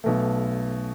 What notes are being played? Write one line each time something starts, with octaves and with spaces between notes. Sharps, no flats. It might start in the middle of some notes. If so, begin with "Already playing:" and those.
B1 B2 A3